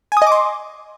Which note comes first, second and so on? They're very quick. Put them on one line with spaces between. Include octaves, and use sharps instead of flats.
G#5 D#6 D#5 D6 C6